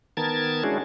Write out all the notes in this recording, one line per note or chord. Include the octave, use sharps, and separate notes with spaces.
D#3 B3 A#4 A5 G#6 A6
G#3 C#4 D4 E4 F#4 G#4